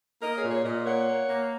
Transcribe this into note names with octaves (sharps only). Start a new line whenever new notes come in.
A#3 A#4 D#5
G#4 C#5
A#2
G#4 C#5
A#2 A#4 D#5
A#3 C#5 F#5
A#3
A#3